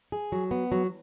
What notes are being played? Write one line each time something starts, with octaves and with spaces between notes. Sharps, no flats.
G#4
F#3
B3
F#3